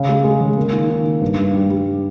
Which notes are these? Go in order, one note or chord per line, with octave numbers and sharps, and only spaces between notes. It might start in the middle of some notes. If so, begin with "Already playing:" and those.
Already playing: C#3
G#3
G#3
C#3
A#3
D#3
D#3
D#3
G2
G2
G3
G3